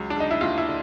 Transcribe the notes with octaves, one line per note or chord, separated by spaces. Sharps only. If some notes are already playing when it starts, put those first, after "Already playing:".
Already playing: C#2 F#3
D4
C#3 D#4
E4
D#2 F4
E4
D3